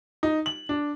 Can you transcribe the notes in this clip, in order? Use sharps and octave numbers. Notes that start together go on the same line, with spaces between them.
D#4
F#7
D4